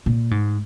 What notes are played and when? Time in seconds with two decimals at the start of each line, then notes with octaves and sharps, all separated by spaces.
0.06 A#2
0.31 G#2